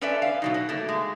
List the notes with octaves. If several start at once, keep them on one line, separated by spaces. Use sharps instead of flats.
C#4 D4 A4 B4 D5 E5
F5
B2 F#3 D#4
F#4
A3 A#3
G#3